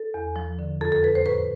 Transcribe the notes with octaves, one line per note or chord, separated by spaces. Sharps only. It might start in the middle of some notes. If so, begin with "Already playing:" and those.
Already playing: A4
E2
F3
D3
F2 A4
A4
F2 B4
C5
A2 B4